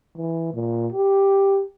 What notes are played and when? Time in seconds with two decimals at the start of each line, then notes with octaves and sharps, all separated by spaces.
0.17 E3
0.54 A#2
0.92 G4